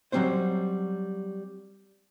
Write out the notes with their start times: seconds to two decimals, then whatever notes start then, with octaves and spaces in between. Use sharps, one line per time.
0.12 F#3 G3 C4 C#4 C5